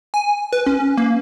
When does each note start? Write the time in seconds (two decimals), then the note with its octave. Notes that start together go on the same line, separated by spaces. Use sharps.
0.14 G#5
0.53 B4
0.66 C#4
0.97 A#3